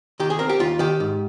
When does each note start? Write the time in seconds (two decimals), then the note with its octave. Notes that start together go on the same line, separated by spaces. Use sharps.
0.20 D#3 G4
0.30 G#4
0.39 C4 A#4
0.49 G4
0.59 D#2 F4
0.79 D#3 G4
1.00 G#2